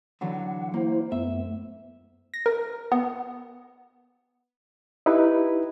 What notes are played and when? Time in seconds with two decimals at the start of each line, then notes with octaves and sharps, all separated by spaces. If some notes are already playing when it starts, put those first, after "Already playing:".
0.21 D3 E3 F#3 F#5
0.74 A#3 E4 C5
1.12 F#2 A3 B3 E5
2.34 A#6
2.46 A#4
2.92 B3
5.06 D#4 E4 G4 B4